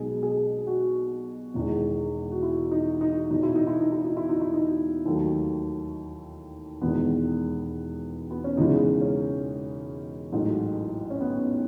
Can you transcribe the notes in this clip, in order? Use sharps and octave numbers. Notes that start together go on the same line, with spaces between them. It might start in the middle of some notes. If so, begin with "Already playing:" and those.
Already playing: B1 B2 G#3 G#4
G#4
F#4
E1 E2 D#3 G#3
F#4
E4
D#4
D#4
E1 E2 B2 D#4
E4
D#4
E4
D#4
E4
D#4
E4
D#4
E4
D#4
D#2 D#3 F#3 A3
E1 E2 D#3 G#3 B3
B3
C#4
E1 E2 C#3 E3 G#3 D#4
C#4
A1 G#2 F#3 A3
C#4
B3